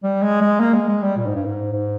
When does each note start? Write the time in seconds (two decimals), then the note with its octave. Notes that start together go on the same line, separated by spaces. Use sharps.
0.03 G3
0.22 G#3
0.41 G#3
0.60 A#3
0.74 G#3
0.88 G#3
1.02 G3
1.16 A#2
1.26 G#2
1.35 G2
1.45 G#2
1.72 G#2